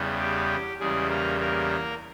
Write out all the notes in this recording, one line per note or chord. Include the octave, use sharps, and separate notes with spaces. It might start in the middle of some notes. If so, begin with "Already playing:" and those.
Already playing: E2 C#3 G3 B3
G4
E2 C#3 G3 G#3 G#4
A#3 A#4
A#3 A#4